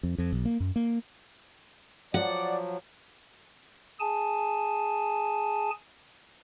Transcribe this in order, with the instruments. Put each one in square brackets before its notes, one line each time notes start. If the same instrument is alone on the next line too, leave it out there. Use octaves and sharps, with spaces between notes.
[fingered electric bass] F2
F2
B1
A#3
F#2
A#3
[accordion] F3 F#3 [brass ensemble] D5 [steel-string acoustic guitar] F#5
[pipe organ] G#4 G#5 A5